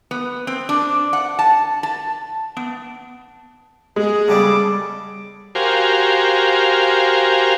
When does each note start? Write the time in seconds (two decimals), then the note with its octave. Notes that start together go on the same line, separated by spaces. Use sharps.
0.11 B3
0.47 C4
0.69 D4
1.13 F#5
1.39 A5
1.83 A5
2.57 B3
3.96 G#3 G#4
4.28 C#3 G3 B3 A4 A5 D6
5.55 F#4 G4 A#4 C5 F5 G#5